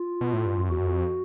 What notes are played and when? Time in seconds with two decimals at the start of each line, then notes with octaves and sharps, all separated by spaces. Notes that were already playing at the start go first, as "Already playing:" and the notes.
Already playing: F4
0.21 B2
0.33 A2
0.46 G2
0.57 F#2
0.69 E2 F#4
0.79 F#2
0.86 F2